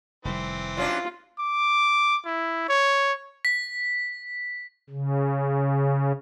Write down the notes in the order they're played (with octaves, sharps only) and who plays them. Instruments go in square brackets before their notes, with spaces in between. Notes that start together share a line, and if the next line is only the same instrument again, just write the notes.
[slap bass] F1 D#3 G3 [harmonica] E3 C4
[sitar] F#3 C#4 D4 [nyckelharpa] F4
[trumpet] D6
E4
C#5
[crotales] B6
[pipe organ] C#3